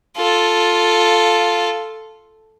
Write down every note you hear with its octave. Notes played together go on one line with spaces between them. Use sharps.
F4 A4